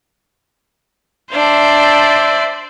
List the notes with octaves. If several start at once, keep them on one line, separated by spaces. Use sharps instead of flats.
D4 C5 D5 E5